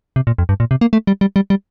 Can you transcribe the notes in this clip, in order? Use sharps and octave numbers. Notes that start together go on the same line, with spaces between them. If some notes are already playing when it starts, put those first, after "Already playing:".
C3
A#2
F2
G2
A#2
C3
A#3
A3
G3
G3
G3
G3